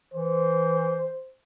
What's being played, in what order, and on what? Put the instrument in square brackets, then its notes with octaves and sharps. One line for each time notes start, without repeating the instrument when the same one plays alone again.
[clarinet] E3 [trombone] C5